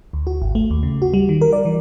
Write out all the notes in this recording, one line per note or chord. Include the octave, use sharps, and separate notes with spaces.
D2
F#4
G#1
A3
D#2
C#3
F#4
G3
D#3
A#4
D5
E3